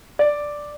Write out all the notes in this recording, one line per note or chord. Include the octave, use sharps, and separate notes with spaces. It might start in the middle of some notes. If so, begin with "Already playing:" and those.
D5